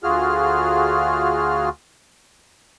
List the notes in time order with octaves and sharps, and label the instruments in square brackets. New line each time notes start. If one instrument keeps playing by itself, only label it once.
[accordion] D2 F4 F#4 G#4 F6